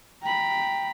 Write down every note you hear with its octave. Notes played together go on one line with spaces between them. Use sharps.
G5 A#5 B5